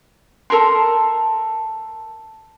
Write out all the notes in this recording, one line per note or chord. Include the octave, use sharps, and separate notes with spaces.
A4 A#4 A#5 C6